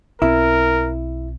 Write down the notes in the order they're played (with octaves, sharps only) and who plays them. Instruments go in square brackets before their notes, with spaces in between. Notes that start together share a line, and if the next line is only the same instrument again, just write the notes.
[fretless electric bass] B1 C4 [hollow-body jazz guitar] E4 [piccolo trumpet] A#4